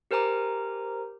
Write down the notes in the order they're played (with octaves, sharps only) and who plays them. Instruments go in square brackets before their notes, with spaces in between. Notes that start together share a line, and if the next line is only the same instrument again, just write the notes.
[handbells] G4 A#4 C5 G#5 A#5 D6